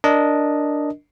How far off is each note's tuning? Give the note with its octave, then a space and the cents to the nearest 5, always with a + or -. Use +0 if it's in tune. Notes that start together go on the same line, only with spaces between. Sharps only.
D4 +0 A#4 +0 D#5 +0